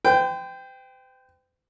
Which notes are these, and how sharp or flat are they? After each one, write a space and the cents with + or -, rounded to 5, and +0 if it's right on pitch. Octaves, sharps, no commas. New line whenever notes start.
C5 -45 G5 +0